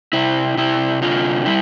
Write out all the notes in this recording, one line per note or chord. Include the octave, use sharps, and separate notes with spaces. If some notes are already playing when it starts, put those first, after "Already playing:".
C3 E4
C3 E4
D3 F4
G3 E4